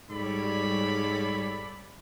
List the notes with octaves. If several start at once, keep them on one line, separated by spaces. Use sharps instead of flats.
G#2 G3 A4 C#5 D5 B5